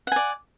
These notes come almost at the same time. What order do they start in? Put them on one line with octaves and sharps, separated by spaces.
F#5 G#5 D5